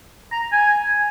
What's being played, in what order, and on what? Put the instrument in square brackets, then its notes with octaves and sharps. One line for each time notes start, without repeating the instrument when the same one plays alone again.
[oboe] A#5
G#5